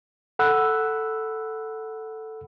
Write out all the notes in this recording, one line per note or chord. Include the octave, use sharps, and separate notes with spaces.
A4 F#5 B5 E6 F#6